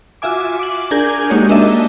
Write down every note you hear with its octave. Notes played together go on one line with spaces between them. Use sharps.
F4 F#4 E5 G#5 D6
D6 F#7
D4 G#4 A#4 G#5 G6
G#3 A#3 D#4 F#4 G4 C#5
A#3 D4 D#5 E5 A5